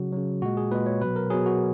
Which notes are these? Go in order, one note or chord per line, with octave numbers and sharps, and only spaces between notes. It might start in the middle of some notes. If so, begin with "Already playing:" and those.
Already playing: C#3 F#3 F#4
C#3 F#3
A#2 G#3 F#4
G#4
A#2 G#3 B4
C#5
B2 F#3 B4
A#4
B2 F#3 G#4
F#4